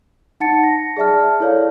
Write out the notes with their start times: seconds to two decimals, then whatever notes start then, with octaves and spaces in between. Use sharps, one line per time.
0.40 D#4 F#5 A5 A6 C#7
0.63 A#6
0.97 G#4 D5 E5 A5 F6
1.40 E4 A4 C#5 D5 F5